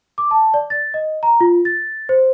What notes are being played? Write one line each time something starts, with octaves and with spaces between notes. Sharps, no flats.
D6
A5
D5
A6
D#5
A#5
F4
A6
C5